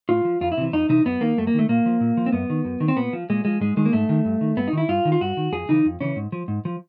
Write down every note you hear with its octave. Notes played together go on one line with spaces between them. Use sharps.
A2 F4
F3
F2 F4
E4
C3 E3
F2 D#4
C3 E3 D#4
F#2 B3
D#3 A#3
F#2 A3
A#3
D#3 A3
A#2 A#3
F3
A#2
F3
C4
F#2 B3
D#3
F#2
D#3
C4
A#2 B3
F3
A#2 G#3
F3 G#3
G#2 G#3
D#3 G#3
A#3
G#2 A3
D#3
G2
D#3
G2 B3
D#4
D#3 E4
G2 F4
D#3
F4
G2 F#4
D#3
F2 G#4
C#3 E3 D#4
F2
C#3 E3 C#4
G#2
F3
G#2
F3